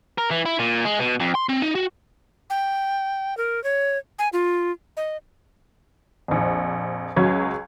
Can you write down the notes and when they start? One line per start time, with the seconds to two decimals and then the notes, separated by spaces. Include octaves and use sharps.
0.18 A#4
0.31 E3
0.45 E4
0.59 A#2
0.85 G#3
0.99 B2
1.20 F2
1.35 C6
1.49 C4
1.62 D#4
1.75 F#4
2.50 G5
3.37 A#4
3.64 C#5
4.19 G#5
4.33 F4
4.97 D#5
6.28 A#1 F2
7.16 C#2 F#3 C#4 G#6